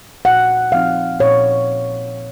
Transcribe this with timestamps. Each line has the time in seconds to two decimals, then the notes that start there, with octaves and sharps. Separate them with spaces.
0.25 A#2 F#5
0.72 F3 C4 D#4 F5
1.20 A#2 C#5